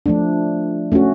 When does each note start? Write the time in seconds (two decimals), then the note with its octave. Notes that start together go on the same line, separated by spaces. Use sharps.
0.06 F3 A3 D4
0.92 A3 C#4 F#4